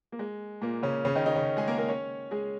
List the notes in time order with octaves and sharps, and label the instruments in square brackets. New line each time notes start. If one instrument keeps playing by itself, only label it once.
[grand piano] A#3
G#3
A#2 A#3
C#3 C#4
C#3 C#4
D#3 D#4
D#3 D#4
C#3 C#4
G#3 G#4
A#3 A#4
A#3 A#4
C#4 C#5
G#3 G#4